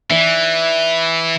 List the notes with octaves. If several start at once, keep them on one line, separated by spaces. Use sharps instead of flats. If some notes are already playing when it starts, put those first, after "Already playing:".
E3 E4 D5